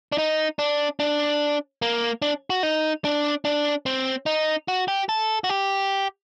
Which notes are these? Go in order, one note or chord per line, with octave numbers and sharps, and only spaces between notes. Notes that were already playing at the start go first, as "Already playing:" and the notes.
D4
D#4
D4
D4
A#3
D4
F#4
D#4
D4
D4
C4
D#4
F#4
G4
A4
F#4
G4